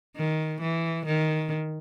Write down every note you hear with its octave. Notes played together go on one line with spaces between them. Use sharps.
D#3
E3
D#3